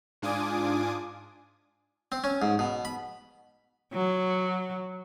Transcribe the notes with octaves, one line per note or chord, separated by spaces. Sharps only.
G#2 D4 F4 G#5 D6 D#6
C4
C#4
G#2
B2
B5
F#3